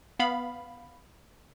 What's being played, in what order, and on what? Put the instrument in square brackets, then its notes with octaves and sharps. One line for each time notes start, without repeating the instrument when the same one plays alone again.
[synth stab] B3 F5 B5